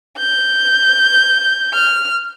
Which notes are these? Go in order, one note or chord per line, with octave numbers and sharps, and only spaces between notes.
G6
F6